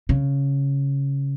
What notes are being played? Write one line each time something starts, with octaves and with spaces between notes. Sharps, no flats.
C#3